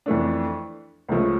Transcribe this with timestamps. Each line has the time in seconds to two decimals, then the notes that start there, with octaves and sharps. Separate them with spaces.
0.06 F2 E3 A3 D4
1.09 C#2 C#3 F3 A3